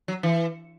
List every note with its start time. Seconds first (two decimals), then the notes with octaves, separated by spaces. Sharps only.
0.08 F#3
0.23 E3